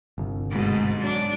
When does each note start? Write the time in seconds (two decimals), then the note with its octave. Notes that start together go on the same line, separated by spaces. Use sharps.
0.18 G1 C2
0.51 G#2 B2 A3
1.00 F#3 D4